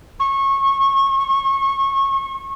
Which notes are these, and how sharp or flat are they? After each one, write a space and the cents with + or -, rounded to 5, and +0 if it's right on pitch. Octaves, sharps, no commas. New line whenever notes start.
C#6 -25